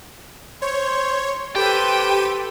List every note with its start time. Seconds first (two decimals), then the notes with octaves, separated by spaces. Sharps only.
0.62 C5 C#5
1.56 G4 A4 B4 C5 G5 D#7